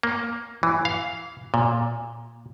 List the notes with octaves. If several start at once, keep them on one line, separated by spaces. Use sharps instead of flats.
A#3
E3
F5
A#2